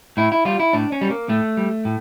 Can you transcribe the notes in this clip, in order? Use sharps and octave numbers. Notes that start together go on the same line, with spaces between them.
A2 E4
E4
G3 F4
E4
A2 D4
C#4
G3
A#3
A2 A3
G3
A2